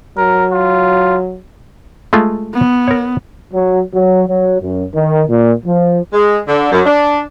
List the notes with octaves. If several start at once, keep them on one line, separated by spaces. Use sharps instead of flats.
F#3 A#4
F4
G#3 A3 F4
B3
A#4 C#5
F#3
F#3
F#3
F#2
D#3
A#2
F3
G#3
D3
F#2
D4